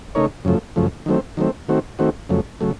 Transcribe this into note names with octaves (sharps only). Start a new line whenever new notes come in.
C#3 A3 D#4 A#4 C#5
F#2 C#3 F3 A3
F#2 C#3 F3 A3
D#3 F#3 A3 C4
D#3 F#3 A3 C4
D#3 A3 C4 F#4
D#3 A3 C4 F#4
F2 C#3 F#3 A3
C#3 F#3 A3